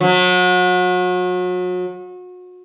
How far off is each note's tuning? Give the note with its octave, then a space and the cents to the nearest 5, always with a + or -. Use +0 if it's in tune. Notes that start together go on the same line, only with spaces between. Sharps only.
F#3 -35